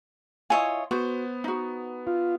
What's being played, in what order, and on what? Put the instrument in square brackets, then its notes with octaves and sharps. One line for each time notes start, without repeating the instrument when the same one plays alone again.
[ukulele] E4 G#5 [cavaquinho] F4 C#5 D#5
[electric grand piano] B3 [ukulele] F#4 [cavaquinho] C5
[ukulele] D#4 F#4
[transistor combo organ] F4